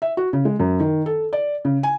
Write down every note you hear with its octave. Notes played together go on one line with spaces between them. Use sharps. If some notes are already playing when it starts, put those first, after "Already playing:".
E5
F#4
C#3
G#3
F#2
D#3
A4
D5
C#3
G#5